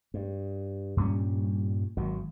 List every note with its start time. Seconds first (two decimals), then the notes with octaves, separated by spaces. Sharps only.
0.14 G2
0.97 G2 A#2 G3 C#4
1.97 G#1 D#3 F#3